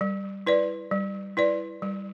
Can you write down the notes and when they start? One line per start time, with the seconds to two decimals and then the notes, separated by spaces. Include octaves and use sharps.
0.01 G3
0.47 E4 B4 D5
0.91 G3
1.37 E4 B4 D5
1.82 G3